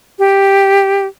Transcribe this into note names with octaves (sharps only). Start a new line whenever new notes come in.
G4